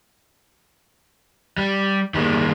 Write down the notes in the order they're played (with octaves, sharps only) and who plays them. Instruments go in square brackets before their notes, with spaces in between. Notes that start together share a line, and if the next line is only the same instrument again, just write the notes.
[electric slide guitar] G3
D#3 G3 G#3 A#3